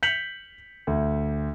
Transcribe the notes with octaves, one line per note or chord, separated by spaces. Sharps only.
G6 B6 C#7 F7 F#7
D2